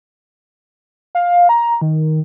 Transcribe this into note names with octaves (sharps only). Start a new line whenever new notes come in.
F5
A#5
D#3